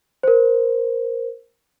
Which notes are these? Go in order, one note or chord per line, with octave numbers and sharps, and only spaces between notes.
A#4 C5